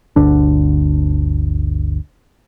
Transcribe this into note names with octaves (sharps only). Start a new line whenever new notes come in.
G1 D2 D3 D4